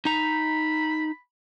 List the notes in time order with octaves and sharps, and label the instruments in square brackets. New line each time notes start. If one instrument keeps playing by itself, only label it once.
[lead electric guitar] D#4 A#5 [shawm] B5